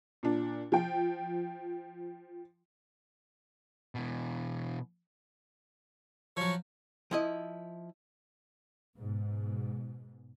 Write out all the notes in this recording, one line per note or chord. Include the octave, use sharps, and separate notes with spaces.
A#2 D4
F3 G5
B2 E3
F3 F#3 C#5
F3 E4 D#5
G#2 B2